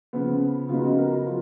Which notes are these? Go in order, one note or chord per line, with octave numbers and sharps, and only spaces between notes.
C#3 F3 B3
C#3 F#3 B3 D#4 F4
F#4
A#4
F#4
F3 F4